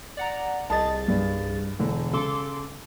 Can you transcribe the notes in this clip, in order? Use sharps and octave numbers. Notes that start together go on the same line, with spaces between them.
D5 F#5 A#5
C2 G#4 D#5 A5 A6
G2
E1 D3
C#3 A4 C6 D6